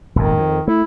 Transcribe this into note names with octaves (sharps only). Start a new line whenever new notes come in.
D#1 G#1 F2 D#3
F2
A3 E4